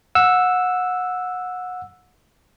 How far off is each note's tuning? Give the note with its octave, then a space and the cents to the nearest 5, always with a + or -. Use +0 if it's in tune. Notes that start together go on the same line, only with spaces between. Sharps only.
F#5 -25 E6 +0